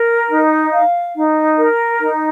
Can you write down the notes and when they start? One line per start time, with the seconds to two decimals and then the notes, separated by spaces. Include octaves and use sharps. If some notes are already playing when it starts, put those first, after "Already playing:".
Already playing: A#4
0.29 D#4
0.72 F5
1.15 D#4
1.57 A#4
2.00 D#4